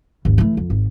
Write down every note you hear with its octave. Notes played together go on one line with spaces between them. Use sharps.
G#1 D#2
E3 A3
F2
G#1